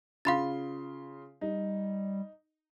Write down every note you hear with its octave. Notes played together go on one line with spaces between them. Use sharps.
C#3 F4 F5 B5 C6 A6
G3 D#4